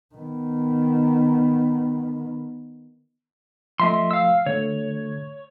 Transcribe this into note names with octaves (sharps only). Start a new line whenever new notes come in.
D#3 B3
F3 A3 D#5 E5 C6
F5 E6
D3 A3 C#5